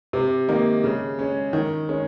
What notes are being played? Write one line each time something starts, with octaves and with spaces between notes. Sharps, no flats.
C3
D#3 A#3 D#4
C#3
G#3 C#4
D#3
G#3 C#4